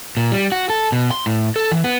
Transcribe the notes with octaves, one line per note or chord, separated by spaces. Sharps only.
A#2
G3
F#4
A4
B2
C6
A2
A4
E3
B3